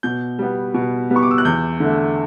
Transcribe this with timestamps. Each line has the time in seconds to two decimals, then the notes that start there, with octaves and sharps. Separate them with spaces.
0.03 B2 G6
0.39 G3 B3
0.74 B2
1.10 G3 B3
1.16 C#6
1.22 D6
1.31 E6
1.38 F#6
1.45 E2 G6
1.80 D3 A3